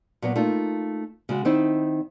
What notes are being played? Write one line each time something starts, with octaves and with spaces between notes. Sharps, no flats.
A#2 F#3 B3
A3 A#3 D#4 F4
C#3 G#3 F#4
D#3 C4 D#4 E4